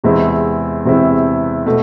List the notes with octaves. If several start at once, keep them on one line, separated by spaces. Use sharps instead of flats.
E2 C3 G#3 C4 E4
E2 C3 G#3 C4 E4
B2 A3